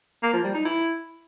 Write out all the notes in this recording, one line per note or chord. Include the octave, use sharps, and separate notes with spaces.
A#3
F3
G3
D#4
E4